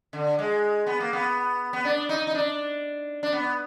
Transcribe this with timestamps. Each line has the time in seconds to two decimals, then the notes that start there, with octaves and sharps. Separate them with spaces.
0.13 D3
0.39 G#3
0.87 B3
1.00 A#3
1.13 B3
1.73 B3
1.85 D4
2.09 D#4
2.27 D#4
2.35 D4
3.23 D4
3.33 B3